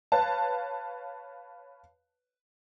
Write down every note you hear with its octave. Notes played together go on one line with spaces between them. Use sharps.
B4 C#5 F5 A5